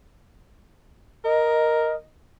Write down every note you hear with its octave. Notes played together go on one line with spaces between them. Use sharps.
A#4 D#5